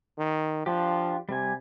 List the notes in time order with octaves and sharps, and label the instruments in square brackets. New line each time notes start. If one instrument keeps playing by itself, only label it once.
[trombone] D#3
[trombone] F3 [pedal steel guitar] D4 F4 G4
[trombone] C3 [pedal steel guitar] G3 G#5